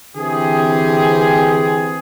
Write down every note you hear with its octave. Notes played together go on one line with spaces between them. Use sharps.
D3 E3 C4 G4 G#4